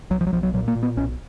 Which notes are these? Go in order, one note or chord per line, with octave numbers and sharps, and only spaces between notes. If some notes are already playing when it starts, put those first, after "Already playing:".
B1 F#3
F3
F#3
B1 F3
F#3
A#2 F#3
A#3
A#2
B3
B1 C#4